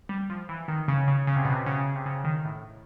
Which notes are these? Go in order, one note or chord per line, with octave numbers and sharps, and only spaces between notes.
G3
F3
E3
D#3
C#3
C#3
C#3
C3
B2
C3
C#3
C3
C#3
D#3
A2